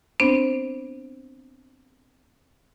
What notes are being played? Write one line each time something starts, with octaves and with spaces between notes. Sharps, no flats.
B3 C4 D4 C5